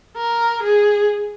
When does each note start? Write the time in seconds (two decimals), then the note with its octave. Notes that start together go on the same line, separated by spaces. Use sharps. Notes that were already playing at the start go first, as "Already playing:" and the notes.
0.17 A#4
0.63 G#4